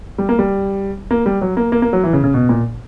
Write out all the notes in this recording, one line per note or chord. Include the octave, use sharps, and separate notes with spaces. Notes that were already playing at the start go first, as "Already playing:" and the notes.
G3
A#3
G3
A#3
G3
F#3
A#3
A#3
A#3
F#3
E3
C#3
C#3
B2
A#2